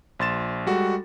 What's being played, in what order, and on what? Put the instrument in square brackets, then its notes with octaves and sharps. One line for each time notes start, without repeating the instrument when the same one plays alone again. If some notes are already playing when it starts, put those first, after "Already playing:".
[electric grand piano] A#1 C6 A6 E7
G3 G#3 F#4 A4